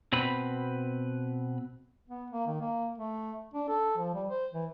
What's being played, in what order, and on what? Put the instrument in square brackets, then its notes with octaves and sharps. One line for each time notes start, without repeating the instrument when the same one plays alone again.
[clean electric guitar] B2 C4 B4 B5
[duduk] B3
A#3
D#3
A#3
A3
D4
A4
F3
G3
C5
E3